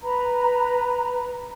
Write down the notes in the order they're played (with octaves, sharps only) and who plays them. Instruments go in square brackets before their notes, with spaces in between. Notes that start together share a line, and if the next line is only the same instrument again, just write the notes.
[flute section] B4 A#5 B5